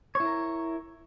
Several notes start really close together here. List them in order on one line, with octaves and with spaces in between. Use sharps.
C#5 E4 A#4